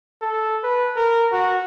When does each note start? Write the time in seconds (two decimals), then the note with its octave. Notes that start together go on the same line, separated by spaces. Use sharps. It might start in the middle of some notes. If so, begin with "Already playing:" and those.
0.22 A4
0.63 B4
0.96 A#4
1.32 F#4